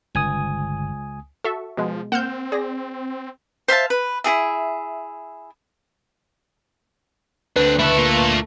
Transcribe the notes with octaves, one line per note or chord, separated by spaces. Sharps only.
G1 C#2 G#5 D#6
F#4 A4 E5 C#6
B2 F3 G#3
A#3 C4 F#5 F6 G6 E7
G#4 D5 A#6
C5 E5 F5 A5
B4
E4 F#4 G#4 E5
D2 D3 C4 D4 B4
C#2 A3 E4 A4
A#3 F4